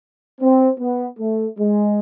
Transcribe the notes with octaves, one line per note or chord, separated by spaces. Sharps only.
C4
B3
A3
G#3